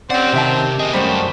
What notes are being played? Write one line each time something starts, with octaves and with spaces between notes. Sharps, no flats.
C4 C#4 G4 D5 F#5
C3 D#3 G4 E5 A5
A#3 G#4 D#5
F#2 G3 A3 A#3 F#4 C5 B5